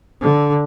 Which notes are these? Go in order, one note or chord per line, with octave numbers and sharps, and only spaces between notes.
D3